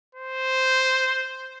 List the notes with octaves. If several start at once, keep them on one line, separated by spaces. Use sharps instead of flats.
C5